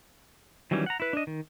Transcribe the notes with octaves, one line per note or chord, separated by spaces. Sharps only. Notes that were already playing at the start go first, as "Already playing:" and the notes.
D#3 E3 F#3 G3 C#4
F#5 A#5
E4 B4
D4 D#5
D#3